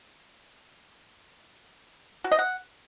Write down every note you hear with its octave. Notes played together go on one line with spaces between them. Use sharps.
F#4
D#5
F#5